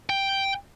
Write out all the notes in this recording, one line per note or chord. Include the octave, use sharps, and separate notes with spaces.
G5